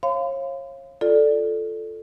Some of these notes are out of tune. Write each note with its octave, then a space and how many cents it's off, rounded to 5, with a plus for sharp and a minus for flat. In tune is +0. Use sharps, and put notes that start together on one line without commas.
C#5 -35 F5 -15 C6 -45
F4 +0 A4 +0 D5 +5